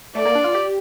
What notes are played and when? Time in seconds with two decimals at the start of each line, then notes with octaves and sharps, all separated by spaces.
0.15 A3 D5
0.25 A#3
0.35 D4
0.44 F4
0.55 G4